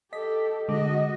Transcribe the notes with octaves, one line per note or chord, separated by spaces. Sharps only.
G4 A4 D#5 B6
D3 G#3 F#4 D#5 D6